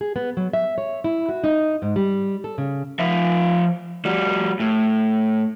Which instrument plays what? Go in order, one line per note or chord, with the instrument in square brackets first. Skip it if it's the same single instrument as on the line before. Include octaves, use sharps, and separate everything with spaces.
[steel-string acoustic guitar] G#4
B3
F#3
E5
C#5
E4
F#4
D#4
G#2
G3
A4
C#3
[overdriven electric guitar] F3 E5
G3 F#4
A2